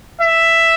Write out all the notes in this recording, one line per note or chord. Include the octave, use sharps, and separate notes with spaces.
E5